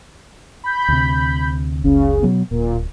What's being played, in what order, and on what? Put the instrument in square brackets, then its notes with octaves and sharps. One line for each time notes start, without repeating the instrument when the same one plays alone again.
[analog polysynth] B5 G6
[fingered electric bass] D2 C3
[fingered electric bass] F#1 C#2 [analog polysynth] C#3
[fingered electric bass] B2 F#3 B3
[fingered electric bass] D1 [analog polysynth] A#2